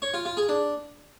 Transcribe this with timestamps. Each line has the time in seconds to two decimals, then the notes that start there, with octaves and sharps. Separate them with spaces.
0.02 C#5
0.14 F4
0.25 F4
0.37 G#4
0.49 D4